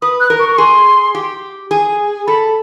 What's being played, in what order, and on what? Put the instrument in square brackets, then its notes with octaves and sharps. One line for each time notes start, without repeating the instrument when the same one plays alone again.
[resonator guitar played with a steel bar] B4 [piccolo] D#6
[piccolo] F#6
[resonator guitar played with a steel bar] A#4
[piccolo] C#6
C#6
[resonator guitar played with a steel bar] G#4 [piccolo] C6
[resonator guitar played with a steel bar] G4
G#4
[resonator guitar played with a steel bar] A4 [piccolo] B5